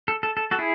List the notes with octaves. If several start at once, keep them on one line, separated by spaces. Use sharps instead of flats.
A4
A4
A4
F#4 A4
E4 G#4